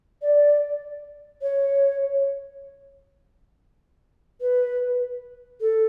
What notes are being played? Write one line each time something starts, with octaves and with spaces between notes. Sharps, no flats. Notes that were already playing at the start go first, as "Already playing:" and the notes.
D5
C#5
B4
A4